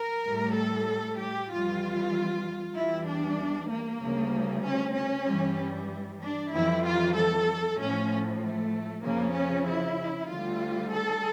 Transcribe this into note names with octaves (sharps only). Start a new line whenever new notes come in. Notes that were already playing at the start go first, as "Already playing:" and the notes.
Already playing: A#4
A2 G3
A4
G4
F2 E3 G3 F4
E2 E3 G3 E4
D4
A#3
D2 C#3 G3
C#4
C#4
G2 E3 G3
D4
F2 E3 G3 E4
F4
A4
A2 F3 C#4
A3
F2 C#3 F3 A#3
C#4
E4
D2 D3 G3 F4
A4